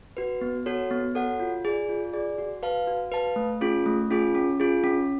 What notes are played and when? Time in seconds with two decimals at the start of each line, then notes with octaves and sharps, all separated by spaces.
0.17 F#4 B4
0.41 B3
0.66 F#4 A4 C#5 F#5
0.91 B3
1.15 F#4 A4 C#5 F#5
1.40 F4
1.65 G#4 D5
1.89 F4
2.13 G#4 D5
2.38 F#4
2.63 B4 F5 A5
2.87 F#4
3.12 B4 F5 A5
3.36 A3
3.61 C#4 F4 G#4
3.86 A3
4.11 C#4 F4 G#4
4.35 C#4
4.60 F4 G#4
4.84 C#4